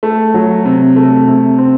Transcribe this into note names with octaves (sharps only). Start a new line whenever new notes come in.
A3
F#3
C3
A3
C3
C4